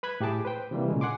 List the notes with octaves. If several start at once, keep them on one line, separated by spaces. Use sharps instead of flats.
B4 B5 F#6 G#6
A2 G4 G#4 A5 D6
B4 C5 G5
C3 E3 G3 A#3
A#2 C#3 G#3
F#5 G#5 C6 D6